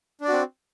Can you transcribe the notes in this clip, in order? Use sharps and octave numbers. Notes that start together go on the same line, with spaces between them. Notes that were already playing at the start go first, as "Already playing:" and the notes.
C4 D4 F#4 D5